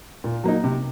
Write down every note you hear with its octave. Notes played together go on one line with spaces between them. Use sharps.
A#2
F#3 A#3 D#4
C3